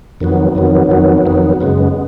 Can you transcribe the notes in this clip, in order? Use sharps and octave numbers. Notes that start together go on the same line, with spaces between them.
F2 D#3 F#3 B3
F2 D#3 F#3 B3
F2 D#3 F#3 B3
F2 D#3 F#3 B3
F#2 C#3 G#3 B3